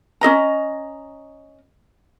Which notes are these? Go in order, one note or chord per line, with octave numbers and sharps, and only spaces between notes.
C#4 G#4 D#5 A#5